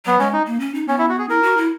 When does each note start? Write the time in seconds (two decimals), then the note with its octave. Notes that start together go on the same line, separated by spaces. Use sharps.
0.05 F#3 B3
0.19 G#3 C#4
0.33 D#4
0.47 A#3
0.60 C#4
0.74 D#4
0.88 B3 C#4
0.99 E4
1.09 F#4
1.19 G#4
1.29 E4 A#4
1.43 F#4
1.57 E4